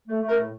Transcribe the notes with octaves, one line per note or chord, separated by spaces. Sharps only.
A3
A3
A#4
A2